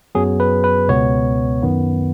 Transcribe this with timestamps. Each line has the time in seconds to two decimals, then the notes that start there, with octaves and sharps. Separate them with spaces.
0.15 F#2 F#3 B3 G#4
0.40 B4
0.64 B4
0.88 C#2 B2 B3 C#5
1.62 F#2 D#3 B3